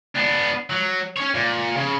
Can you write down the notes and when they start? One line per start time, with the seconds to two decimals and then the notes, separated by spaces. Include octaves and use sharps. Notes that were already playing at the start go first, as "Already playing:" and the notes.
0.15 B3 D4
0.70 F#3
1.16 C#4 C#5
1.35 A#2
1.77 C#3